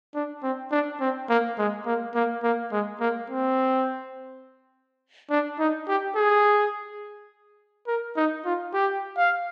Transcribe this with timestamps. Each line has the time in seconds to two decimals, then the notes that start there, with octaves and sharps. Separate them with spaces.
0.15 D4
0.43 C4
0.72 D4
1.01 C4
1.29 A#3
1.58 G#3
1.86 A#3
2.15 A#3
2.44 A#3
2.72 G#3
3.00 A#3
3.30 C4
5.31 D4
5.59 D#4
5.88 G4
6.16 G#4
7.87 A#4
8.17 D#4
8.46 F4
8.74 G4
9.17 F5